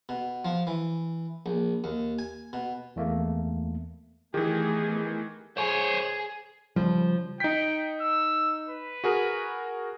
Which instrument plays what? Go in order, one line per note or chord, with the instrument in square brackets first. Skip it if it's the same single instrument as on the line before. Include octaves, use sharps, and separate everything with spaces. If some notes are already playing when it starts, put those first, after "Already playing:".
[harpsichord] B2
F3
E3
A#1
D#2
G#5
B2
[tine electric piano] E2 A3 A#3
[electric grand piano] D#3 E3 [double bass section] A3 B3 [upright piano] G4 [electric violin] G#4
[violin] G#4 [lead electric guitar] C5 C#5
[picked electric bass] C#3 G3 [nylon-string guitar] F3
[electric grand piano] D#4 B6 [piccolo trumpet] G5
[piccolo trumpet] E6
B4
[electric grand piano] F#4 G#4 A#4